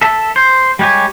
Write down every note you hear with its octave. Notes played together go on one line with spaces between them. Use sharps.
A4 E5
C5
G3 G#3 G4 C#5 G#5